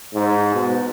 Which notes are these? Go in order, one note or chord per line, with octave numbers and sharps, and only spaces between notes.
G#2
B2